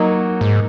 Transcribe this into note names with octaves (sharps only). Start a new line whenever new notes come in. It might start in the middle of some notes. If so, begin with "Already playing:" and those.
Already playing: F#3 A#3 D#4
G#2